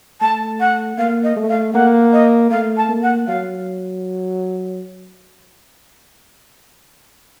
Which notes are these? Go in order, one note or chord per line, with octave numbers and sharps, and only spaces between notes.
A3 A5
F#5
A#3 F5
D#5
A3
F5
A#3 F#5
D#5
A3 F5
A5
A#3
F#5
F#3 F5